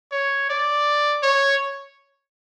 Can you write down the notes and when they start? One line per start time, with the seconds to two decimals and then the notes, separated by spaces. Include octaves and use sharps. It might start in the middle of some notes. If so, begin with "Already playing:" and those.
0.12 C#5
0.50 D5
1.23 C#5